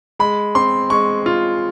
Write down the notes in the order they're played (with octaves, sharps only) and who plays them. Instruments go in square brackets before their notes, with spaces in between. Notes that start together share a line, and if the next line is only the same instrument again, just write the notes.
[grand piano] G#3 B5
C4 C6
G#3 C#6
F4